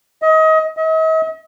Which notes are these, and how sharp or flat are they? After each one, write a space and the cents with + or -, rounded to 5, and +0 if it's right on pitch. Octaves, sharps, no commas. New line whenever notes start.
D#5 +30
D#5 +45